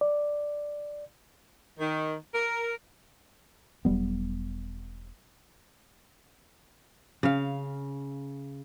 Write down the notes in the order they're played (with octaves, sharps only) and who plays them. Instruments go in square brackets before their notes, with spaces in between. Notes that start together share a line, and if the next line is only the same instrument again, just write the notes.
[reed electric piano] D5
[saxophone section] D#3
A#4
[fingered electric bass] E1 F#3 G3 B3
[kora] C#3 F5